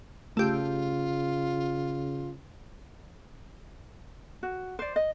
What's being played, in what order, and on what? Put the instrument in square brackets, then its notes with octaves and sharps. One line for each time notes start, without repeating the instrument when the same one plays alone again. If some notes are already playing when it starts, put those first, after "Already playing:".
[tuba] C#3 [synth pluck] A3 G4 [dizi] F4
[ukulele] F#4
C5 D5
D#5